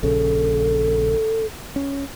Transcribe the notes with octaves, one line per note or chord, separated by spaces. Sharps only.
A#1 C#3 A4
C#4